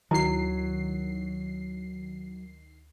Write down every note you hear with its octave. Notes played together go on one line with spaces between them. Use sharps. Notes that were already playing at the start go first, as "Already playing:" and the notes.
D2 D#3 F#3 E4 F#4 C7